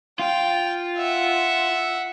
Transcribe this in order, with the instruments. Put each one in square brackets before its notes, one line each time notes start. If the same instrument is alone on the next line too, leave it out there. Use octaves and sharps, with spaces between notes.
[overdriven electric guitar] F4 [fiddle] G5
[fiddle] E5 F#5